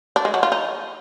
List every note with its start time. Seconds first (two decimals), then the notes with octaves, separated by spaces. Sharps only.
0.16 D4
0.25 G#3
0.34 F#3
0.43 F4
0.52 D#4